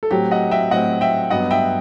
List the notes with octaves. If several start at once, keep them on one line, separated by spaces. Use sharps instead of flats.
A4
A2 F#3 C4 G4
D#5 F#5
E5 G5
A2 F#3 C4 D#5 F#5
E5 G5
G2 F#3 B3 D#5 F#5
E5 G5